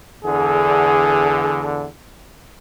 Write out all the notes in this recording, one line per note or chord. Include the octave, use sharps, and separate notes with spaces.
E2 D3 G#4